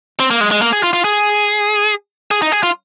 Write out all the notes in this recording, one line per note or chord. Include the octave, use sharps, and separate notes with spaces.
C4
A#3
G#3
G#3
A#3
G#4
F4
F4
G#4
G#4
D#4
G#4
F4